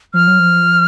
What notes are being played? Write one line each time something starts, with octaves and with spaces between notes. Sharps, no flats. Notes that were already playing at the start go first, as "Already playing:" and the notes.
F3 F6
F#3
F3